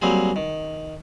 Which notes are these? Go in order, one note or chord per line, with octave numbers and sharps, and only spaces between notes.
F#3 G3 A#3 C4 G#4
D#3